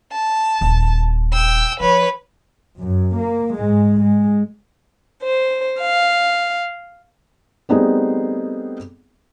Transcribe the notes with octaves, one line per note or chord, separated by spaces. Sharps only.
A5
D#1
G5 E6
F3 B4 C#5
F#2
A#3
G#2 G#3
G#3
C5
F5
G3 A3 B3 C4 D#4 G#4